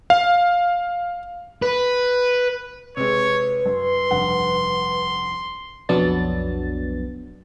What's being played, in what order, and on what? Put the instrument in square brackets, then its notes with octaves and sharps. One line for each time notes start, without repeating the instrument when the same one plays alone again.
[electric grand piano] F5
[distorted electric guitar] B4
[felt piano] C3 G#3 [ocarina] B4 [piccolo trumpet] C#5
[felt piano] F#2 [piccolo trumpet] C6
[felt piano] F1 G2 F#5
[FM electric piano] B1 F2 F#3 B3 D4 A6